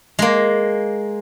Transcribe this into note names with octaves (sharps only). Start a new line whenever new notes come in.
G#3 A#3